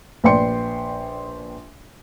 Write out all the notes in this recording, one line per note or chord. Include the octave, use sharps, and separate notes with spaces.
A#1 B4 D5 G5 C6 C#7